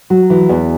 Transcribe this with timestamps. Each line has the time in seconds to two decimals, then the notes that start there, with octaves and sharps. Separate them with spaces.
0.10 F#3
0.30 E3
0.49 E2